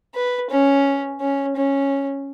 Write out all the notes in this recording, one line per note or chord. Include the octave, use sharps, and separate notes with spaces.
B4
C#4
C#4
C#4